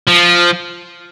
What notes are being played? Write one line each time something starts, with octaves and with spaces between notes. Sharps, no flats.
F3